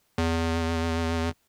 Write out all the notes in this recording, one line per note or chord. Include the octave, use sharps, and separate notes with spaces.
E2